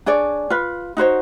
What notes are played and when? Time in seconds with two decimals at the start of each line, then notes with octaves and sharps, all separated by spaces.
0.06 D4 G#4 C#5 D5
0.50 F4 B4
0.97 D#4 F#4 C5 C#5